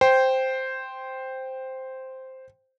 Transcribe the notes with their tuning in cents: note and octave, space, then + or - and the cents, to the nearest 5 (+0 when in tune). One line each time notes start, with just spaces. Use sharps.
C5 +0 G5 +0